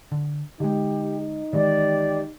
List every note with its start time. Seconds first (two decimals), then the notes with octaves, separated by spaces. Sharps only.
0.12 D3
0.60 D3 G#3 D#4 G4
1.53 D#3 E3 G#3 G4 D5